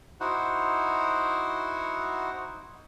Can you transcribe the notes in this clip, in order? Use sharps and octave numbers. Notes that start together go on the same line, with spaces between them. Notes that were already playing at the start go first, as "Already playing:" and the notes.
D#4 E4 F#4 C5 F#5